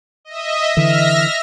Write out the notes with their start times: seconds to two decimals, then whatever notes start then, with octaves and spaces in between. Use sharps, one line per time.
0.25 D#5 E5
0.77 D3 E3 E5 F6 A#6